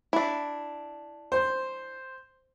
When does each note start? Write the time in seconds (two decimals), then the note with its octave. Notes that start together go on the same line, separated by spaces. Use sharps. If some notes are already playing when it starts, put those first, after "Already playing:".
0.13 D4 E4
1.32 C5